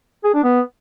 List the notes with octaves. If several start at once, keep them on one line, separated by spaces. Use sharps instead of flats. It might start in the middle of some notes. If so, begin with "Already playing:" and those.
G#4
D4
B3